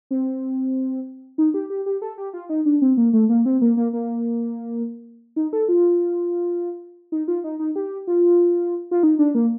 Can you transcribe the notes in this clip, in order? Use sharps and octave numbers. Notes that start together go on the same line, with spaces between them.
C4
D#4
G4
G4
G4
A4
G4
F4
D#4
D4
C4
A#3
A3
A#3
C4
A#3
A#3
A#3
D#4
A4
F4
D#4
F4
D#4
D#4
G4
F4
F4
D#4
D4
A#3